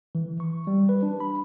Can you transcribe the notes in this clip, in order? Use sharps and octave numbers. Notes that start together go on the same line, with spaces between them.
E3
C#6
G3
B4
D4
B5